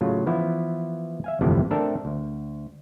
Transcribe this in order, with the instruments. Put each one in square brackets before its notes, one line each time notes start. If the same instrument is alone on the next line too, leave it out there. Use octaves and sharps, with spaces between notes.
[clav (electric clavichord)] A2 C#3 F#3 F4
E3 F3 B3 E4
E5 F5 G#5
G1 F2 A2 C3 E3
A3 C4 D4 A4 A#4 E5
D2